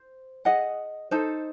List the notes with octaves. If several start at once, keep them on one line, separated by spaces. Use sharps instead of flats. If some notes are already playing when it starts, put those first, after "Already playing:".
Already playing: C5
G#4 D#5 F#5
D#4 A4 C5